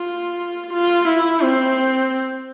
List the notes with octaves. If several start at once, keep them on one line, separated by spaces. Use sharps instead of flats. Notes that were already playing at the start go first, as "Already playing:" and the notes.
Already playing: F4
F4
E4
C4